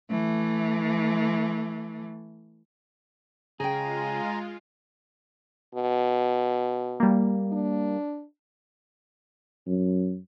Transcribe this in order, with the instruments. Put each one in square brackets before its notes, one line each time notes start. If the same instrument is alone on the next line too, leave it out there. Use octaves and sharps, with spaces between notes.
[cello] E3 A3
[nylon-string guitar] C#3 G5 [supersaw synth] G#3 F4 [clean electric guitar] G#4 [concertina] G#5 A#5
[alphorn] B2
[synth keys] G3 A#3
[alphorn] D4
[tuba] F#2